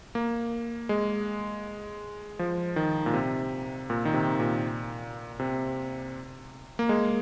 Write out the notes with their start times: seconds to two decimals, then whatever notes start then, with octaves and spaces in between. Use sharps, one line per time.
0.15 A#3
0.89 G#3
2.39 F3
2.76 D#3
3.06 A#2
3.14 C3
3.90 A#2
4.05 D#3
4.13 C3
4.40 A#2
5.40 C3
6.79 A#3
6.89 G#3